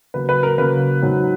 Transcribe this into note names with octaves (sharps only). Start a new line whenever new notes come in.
C#3 F#3 A#3 B4
B4
A#4
C#3 F#3 A#3 B4
G#2 F#3 C#4